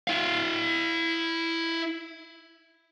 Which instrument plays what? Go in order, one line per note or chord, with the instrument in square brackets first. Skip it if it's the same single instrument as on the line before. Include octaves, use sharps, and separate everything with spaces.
[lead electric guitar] E4 F5